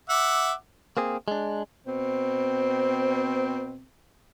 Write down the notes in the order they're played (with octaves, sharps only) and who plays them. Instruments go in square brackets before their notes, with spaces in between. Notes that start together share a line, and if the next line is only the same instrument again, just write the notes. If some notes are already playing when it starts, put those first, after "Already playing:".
[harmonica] E5 F#5 D6
[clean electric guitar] A#3 C4 G#4
G#3 D4
[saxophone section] B2 C4